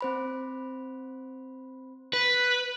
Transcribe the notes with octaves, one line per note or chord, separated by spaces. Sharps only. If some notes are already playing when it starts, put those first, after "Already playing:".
C4 C5 B5
B4